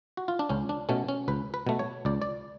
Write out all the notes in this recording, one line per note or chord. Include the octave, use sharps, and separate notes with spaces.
F#4
F4
D4
C#2 C#4
D4
B2 A3 C#4
C#4
C#2 B4
B4
B2 A3
C#5
C#2 D5
D5